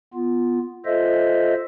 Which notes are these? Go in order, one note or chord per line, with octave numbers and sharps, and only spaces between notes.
B3 F4
F4 A4 C5 D#5 E5